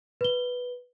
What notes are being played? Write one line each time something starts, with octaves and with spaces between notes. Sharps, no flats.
B4 G7